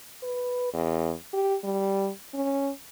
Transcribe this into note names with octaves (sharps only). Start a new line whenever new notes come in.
B4
E2
G4
G3
C#4